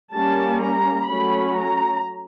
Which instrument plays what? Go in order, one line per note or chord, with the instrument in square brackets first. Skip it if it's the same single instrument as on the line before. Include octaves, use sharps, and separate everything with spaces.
[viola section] G3 A#3 C#4 A5
A#5
F#3 A3 C#4 B5
A#5